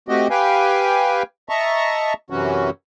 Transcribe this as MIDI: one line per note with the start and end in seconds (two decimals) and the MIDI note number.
0.09 0.28 57
0.09 0.28 60
0.09 0.28 66
0.09 0.28 67
0.09 0.28 75
0.30 1.23 67
0.30 1.23 71
0.30 1.23 77
0.30 1.23 79
0.30 1.23 80
1.49 2.13 75
1.49 2.13 76
1.49 2.13 81
1.49 2.13 82
1.49 2.13 85
2.30 2.70 42
2.30 2.70 48
2.30 2.70 52
2.30 2.70 54
2.30 2.70 61
2.30 2.70 66